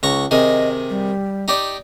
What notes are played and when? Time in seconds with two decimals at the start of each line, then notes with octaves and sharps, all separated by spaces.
0.03 C#2 A#5 C#6
0.31 C3 D#3 G#4 D#5
0.90 G3
1.48 D#4 G4 D5